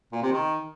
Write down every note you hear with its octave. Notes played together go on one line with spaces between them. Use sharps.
A#2
C3
D#3